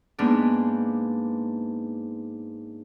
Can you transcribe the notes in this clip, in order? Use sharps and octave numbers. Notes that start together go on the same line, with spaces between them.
G#2 A#3 B3 D4